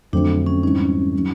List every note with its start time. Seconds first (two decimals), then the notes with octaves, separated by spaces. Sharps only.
0.13 F2 D3 F#3 A3 C4 D4
0.46 C#4
0.63 G#2 E3 G3 C4 C#4 D#4
1.15 D#3 F#3